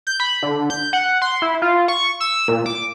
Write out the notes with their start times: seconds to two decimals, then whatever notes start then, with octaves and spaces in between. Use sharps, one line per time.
0.07 G6
0.20 B5
0.43 D3
0.70 G6
0.93 F#5
1.22 C6
1.42 E4
1.62 F4
1.88 C#6
2.20 E6
2.48 A#2
2.66 D6